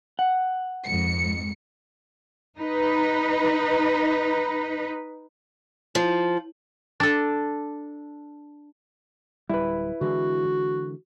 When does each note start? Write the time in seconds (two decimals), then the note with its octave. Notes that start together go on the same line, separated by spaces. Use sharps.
0.19 F#5
0.85 F2 G#2 C#7
2.56 D#4 B4
5.95 F3
7.00 D4 A4
9.49 D1 G3 E4 B4
10.01 D3 E3 G#3 F#4